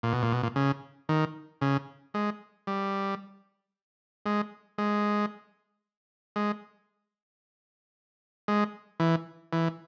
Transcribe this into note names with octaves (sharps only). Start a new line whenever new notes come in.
A#2
B2
A#2
B2
A#2
C#3
D#3
C#3
G#3
G3
G#3
G#3
G#3
G#3
E3
E3